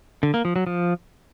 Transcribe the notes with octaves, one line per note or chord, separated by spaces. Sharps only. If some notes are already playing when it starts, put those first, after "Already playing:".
D3
A#3
F3
F#3
F3